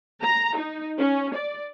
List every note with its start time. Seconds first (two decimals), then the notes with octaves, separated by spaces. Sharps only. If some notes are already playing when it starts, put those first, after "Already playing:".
0.22 A#5
0.56 D#4
0.98 C#4
1.35 D5